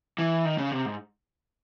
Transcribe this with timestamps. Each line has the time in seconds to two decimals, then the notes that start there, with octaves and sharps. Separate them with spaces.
0.18 E3
0.45 D#3
0.58 C#3
0.72 C3
0.85 G#2